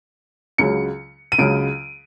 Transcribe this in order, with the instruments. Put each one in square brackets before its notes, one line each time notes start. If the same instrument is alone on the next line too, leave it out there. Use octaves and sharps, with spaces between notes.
[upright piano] C#2 C#3 F#3 [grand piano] C#7
[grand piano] D#7
[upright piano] C#2 C#3 F#3 [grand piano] D7